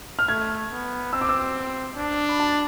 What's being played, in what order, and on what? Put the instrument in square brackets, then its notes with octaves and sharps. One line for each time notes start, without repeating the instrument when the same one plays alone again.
[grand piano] F6
[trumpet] A3 [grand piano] G#6
[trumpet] B3
[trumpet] C4 [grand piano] E6
[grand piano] D6
E6
[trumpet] D4
[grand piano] B5
A5